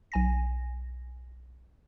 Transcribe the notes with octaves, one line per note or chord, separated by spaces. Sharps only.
B1 G#5 A#6